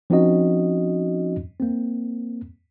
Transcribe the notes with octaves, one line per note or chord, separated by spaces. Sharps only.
F3 C4 C#4 D#4 F#4 D#5
A#3 C4